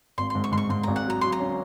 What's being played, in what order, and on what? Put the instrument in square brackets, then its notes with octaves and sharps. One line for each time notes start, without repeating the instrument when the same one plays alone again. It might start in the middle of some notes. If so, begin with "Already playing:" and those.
[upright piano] G#1 [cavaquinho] C6
[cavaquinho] C6
[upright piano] G#2
[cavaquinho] C#6
[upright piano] G#2 [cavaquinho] C6
[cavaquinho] C#6
[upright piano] G#2 [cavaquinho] C6
[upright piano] G#1 [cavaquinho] A#5
[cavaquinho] F#5
[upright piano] F#3 [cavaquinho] A#5
[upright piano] F#3 [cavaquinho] C6
[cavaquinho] A#5
[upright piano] C#4